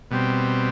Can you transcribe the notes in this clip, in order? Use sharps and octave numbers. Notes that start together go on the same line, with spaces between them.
B2 G3 C4